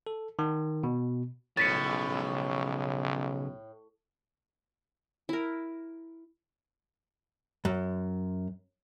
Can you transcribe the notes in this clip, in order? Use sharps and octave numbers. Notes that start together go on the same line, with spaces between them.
A4
D#3
B2
B1 A2 C#3 F3 A6 B6 C#7
E4 A#4
F#2